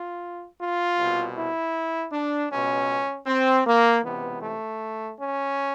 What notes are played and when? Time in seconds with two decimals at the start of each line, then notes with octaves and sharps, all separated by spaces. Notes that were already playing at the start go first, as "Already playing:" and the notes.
Already playing: F4
0.58 F4
0.97 C2 B2
1.36 E4
2.11 D4
2.49 C#2 B2 C#4
3.26 C4
3.65 A#3
4.03 C#2 C3 E3 B3
4.41 A3
5.18 C#4